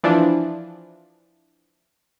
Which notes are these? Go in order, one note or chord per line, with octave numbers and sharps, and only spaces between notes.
E3 F3 D4